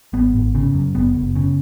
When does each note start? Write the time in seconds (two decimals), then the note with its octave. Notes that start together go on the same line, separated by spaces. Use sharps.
0.13 G#1 B3
0.35 G#1
0.55 C#3
0.74 F#2
0.95 F#1 B3
1.15 F#1
1.35 C#3